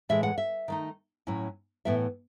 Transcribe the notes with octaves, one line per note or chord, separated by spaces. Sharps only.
A2 E3 G#3 E5
F#5
E5
D#3 A3 D#4
A2 F#3 C#4 E4
A2 E3 B3 E4 E5